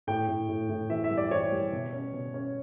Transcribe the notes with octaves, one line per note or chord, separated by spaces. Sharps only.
A2 G5
A2
A2
A2
E3 E5
E5
G3
D5
E3 C#5
G3
B2
C#4
B2
C#4